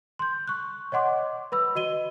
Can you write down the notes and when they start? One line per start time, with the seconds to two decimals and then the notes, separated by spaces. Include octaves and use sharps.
0.19 C6 G6
0.47 C#6 F#6
0.92 C#5 D#5 F#5 C6 D6
1.52 B4 B5 E6
1.75 F#4 D#5 D#7 G7